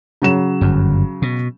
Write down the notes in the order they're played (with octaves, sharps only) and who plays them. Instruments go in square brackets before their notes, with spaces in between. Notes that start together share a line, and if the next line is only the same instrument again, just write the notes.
[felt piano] C#3 F#3 E7
[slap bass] G1 F#2
B2